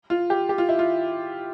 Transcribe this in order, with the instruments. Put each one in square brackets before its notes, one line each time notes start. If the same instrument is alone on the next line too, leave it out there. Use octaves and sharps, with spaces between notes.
[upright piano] F4
G4
G4
F4
E4
F4